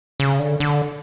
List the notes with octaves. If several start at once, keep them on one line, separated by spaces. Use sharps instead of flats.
C#3
D3
D3